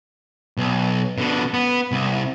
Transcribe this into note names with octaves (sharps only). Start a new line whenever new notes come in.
B1
B2 D3
B3
C2